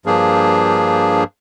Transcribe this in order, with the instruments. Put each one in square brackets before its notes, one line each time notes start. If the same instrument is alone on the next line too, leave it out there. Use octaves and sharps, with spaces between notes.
[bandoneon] G2 F3 A#3 D4 G#4